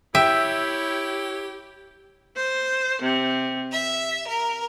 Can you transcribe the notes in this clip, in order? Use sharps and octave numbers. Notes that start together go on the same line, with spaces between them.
E4 G4 C#5 E5 G5
C5
C3
E5
A#4